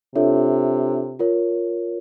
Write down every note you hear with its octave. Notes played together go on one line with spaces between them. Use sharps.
C3 D4 F4 A4 C#5 E5
F4 A#4 C#5